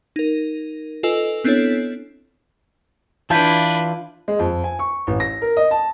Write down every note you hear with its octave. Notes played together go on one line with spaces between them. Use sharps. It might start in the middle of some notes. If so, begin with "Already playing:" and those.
D#4 A#4
F4 A4 B4 D#5 G#5 E6
B3 C4 D4 E4 A4 C#5
E3 D4 E4 F4 B4 A5 G6 B6
G#3
F2
G#5
C#6
A1
A#6
A#4
D#5
A5